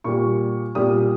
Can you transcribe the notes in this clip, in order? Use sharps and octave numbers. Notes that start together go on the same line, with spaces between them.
A#2 G3 C#6
A#2 G3 D#6